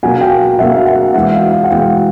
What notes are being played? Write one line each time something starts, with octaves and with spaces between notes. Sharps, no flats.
B2 F#3 A#3 F#5 G#5
F5 G5
B2 F#3 A#3 E5 F#5
F5
E5 F#5
E2 B2 G#3 E5 F#5
F5
F5
F#5
E2 B2 G#3 F5 G5